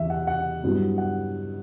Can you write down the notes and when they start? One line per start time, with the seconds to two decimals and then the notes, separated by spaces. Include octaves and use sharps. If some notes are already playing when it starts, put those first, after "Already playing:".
Already playing: E2 C3 E3 E5
0.10 F#5
0.27 F#5
0.63 G2 F#3 B3 E4
0.98 F#5